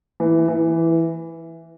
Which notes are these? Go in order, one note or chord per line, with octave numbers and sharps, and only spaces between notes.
E3
E3